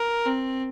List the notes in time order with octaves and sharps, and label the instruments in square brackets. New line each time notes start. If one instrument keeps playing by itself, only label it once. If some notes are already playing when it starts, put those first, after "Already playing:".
Already playing: [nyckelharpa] A#4
C4